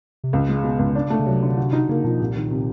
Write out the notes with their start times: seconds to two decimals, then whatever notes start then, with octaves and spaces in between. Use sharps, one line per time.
0.24 C3
0.32 C#2 C#3
0.49 G#3
0.63 B2
0.79 C#2
0.95 D4
1.10 A3
1.19 C#3
1.26 C3 F#3
1.42 D3
1.57 F#4
1.73 D#4
1.89 C#3 A#3
2.04 B2 F3
2.20 C2 A#2
2.36 D#3
2.51 C3